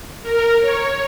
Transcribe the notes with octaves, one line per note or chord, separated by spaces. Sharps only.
A#4
C#5